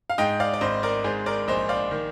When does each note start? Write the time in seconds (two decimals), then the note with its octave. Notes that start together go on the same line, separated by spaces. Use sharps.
0.10 F5
0.18 G#2 D#5 G5
0.40 D5 F5
0.53 D5
0.61 G#1 C5 D#5
0.83 A#4 D5
1.04 G#2 G#4 C5
1.26 A#4 D5
1.48 A#1 C5 D#5
1.69 D5 F5
1.91 D#3